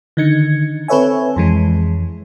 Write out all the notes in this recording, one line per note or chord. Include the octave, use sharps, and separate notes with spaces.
D3 D#3 D#4 G#6 C#7
C4 A4 B4 C#5 E5 G#5
F2 E3 G#3